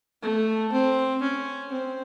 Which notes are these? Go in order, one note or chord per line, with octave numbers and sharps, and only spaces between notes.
A3
C4
C#4
C4